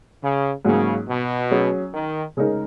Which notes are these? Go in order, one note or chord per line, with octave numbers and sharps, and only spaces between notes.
C#3
G#2 C#3 F#3 A#3 C#4
B2
F#3 C#4 G#4
D#3
C#3 G#3 D#4 A#4